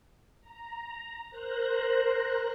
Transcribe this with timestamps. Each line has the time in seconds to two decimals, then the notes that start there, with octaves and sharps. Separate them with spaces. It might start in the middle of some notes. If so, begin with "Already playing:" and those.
0.41 A#5
1.30 A#4 C5 F#6 A#6